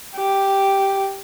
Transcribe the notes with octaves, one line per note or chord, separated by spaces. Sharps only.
G4